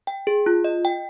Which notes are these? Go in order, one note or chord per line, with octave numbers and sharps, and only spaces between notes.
G5
G#4
F4
D#5
G5